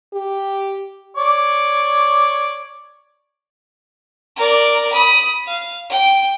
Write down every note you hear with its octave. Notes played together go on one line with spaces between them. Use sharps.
G4
C#5 D5
A#4 D5
B5 D#6
F5
G5